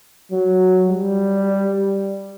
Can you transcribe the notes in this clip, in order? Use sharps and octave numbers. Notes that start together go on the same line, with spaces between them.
F#3
G3